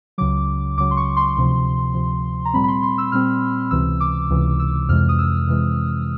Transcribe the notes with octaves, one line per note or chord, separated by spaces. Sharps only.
C#2 C#3 F#3 D6
C#2 C#3 F#3 D6
C6
C#6
C6
D2 C3 F3
D2 C3 F3
A#5
A#2 G3 C4 B5
B5
C6
C6
E6
A#2 G3 C4 F6
C#2 C3 E3 E6
D6
C#2 C3 E3
E6
F2 C3 E3 G#3 F6
D#6
E6
F2 C3 E3 G#3